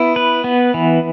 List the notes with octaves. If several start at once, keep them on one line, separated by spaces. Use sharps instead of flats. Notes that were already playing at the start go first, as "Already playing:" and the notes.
Already playing: B3 E4
B4
B3
E3